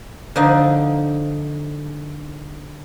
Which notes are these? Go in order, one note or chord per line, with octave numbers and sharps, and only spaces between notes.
D3 F3 D#4